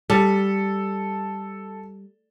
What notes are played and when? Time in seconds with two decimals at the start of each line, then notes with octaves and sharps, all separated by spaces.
0.10 G3 A4